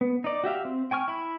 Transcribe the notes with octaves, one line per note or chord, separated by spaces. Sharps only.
B3
D#4 D5
F#4 G4 E5 F5
C4
G5 G#5 C#6 F6
E4 B5